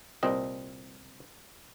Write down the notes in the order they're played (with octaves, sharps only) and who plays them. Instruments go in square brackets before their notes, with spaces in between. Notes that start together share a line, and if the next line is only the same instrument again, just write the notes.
[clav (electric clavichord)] C2 A#2 C4 D#5